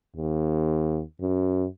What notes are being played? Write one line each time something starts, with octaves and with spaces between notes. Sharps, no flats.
D#2
F#2